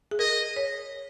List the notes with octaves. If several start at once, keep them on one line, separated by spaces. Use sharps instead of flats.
G#4
A#4 D#5
C#5